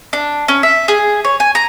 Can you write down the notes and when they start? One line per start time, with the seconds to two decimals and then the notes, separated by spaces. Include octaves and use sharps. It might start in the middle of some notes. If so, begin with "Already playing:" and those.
0.13 D4
0.48 C#4
0.63 E5
0.88 G#4
1.25 C#5
1.40 G#5
1.55 A#5